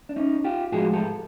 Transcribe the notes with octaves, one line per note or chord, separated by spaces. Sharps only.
D4
C#4 D#4
F4 G4
A2 F3 G#3 F#4 G#4
G4 A4